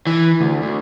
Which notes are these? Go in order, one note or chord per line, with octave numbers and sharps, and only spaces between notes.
E3
D2
D2